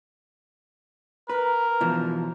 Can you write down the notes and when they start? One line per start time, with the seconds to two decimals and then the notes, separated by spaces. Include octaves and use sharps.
1.29 A#4 B4
1.81 B2 E3 F3